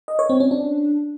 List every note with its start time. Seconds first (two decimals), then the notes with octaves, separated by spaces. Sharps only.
0.08 D#5
0.19 C#5
0.30 C4
0.40 C#4
0.51 D4